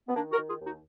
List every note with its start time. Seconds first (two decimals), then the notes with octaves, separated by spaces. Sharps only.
0.09 B3
0.15 D#3 A#3 D4
0.33 F#4 A#4
0.37 D#3
0.48 F4 G#4
0.60 D#2
0.65 D#4 F#4